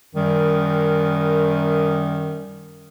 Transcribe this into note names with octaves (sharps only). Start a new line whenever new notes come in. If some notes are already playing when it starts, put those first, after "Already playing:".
F#2 D#3 G3